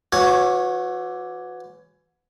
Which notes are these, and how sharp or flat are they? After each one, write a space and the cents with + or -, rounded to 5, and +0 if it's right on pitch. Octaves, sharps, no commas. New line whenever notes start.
E3 +25 F#4 -25 C#5 +0